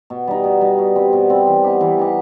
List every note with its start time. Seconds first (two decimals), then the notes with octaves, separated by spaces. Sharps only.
0.10 B2
0.27 G3 D#4
0.44 B2
0.61 G3 D#4
0.78 B2
0.96 G3 C4
1.13 B2
1.30 G3 C4
1.47 E3
1.64 B3 D#4 G4
1.81 E3
1.98 B3 D#4 G4